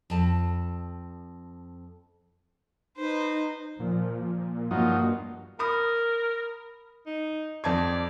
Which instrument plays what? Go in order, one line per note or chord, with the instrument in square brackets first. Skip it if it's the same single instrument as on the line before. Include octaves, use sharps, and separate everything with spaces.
[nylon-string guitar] F2 A5
[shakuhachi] D#4 [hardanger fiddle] B4 C5
[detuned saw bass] A#2 [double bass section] F3
[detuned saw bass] G2 [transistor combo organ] F3 F#3 D#4 [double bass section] A#3
[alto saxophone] A#4 [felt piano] B5 D#6
[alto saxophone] D#4
[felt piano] F2 A5 G#6 [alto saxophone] D5